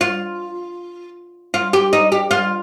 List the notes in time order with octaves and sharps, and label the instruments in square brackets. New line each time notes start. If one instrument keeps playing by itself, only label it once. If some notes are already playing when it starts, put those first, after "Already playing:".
[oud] F4
F4
G4
D#4
G4
F4